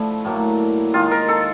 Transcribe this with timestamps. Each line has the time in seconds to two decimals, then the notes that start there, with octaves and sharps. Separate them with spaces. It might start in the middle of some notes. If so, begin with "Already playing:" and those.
Already playing: D3 F3 A3 E4
0.25 A2 F#3 A#3
0.93 D#3 G#3 F4
1.11 A#4
1.28 A4